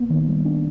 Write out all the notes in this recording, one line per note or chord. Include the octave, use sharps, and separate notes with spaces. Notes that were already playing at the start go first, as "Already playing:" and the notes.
Already playing: A#3 B3
D#3
G3
D4